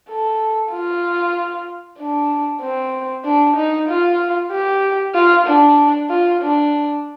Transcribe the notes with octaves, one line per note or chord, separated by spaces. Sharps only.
A4
F4
D4
C4
D4
D#4
F4
G4
F4
D4
F4
D4